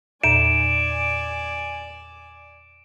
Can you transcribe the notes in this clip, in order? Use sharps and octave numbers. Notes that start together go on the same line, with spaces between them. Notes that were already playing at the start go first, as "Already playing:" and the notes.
E2 A#2 D5 G#5 D7 E7